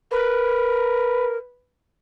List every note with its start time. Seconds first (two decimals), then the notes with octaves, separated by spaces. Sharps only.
0.11 A#4 B4